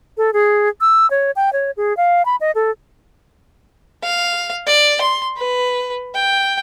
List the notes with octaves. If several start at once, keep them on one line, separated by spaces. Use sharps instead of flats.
A4
G#4
E6
C#5
G5
C#5
G#4
F5
B5
D#5
A4
F5
D5
C6
B4
G5